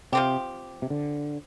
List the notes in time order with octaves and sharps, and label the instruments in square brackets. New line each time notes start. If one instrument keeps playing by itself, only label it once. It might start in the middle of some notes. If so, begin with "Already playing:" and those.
[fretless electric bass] C3 [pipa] F3 C4 G4
[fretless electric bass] C3
D3